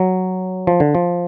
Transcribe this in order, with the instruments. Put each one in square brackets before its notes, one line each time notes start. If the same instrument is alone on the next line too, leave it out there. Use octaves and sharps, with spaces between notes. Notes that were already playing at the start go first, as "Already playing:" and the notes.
Already playing: [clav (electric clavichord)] F#3
F3
D3
F3